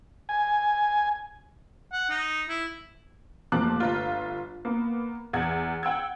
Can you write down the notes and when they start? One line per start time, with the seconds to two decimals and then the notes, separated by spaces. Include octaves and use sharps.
0.29 G#5
1.93 F#5
2.10 D#4
2.49 E4
3.52 F1 F3 A#3 A5 D6 F#6
3.80 G1 F4
4.65 A#3 B3
5.33 E2 G#6
5.83 F#5 G5 E6 G#6